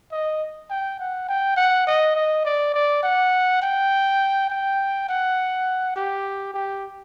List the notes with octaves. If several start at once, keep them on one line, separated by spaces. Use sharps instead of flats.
D#5
G5
F#5
G5
F#5
D#5
D#5
D5
D5
F#5
G5
G5
F#5
G4
G4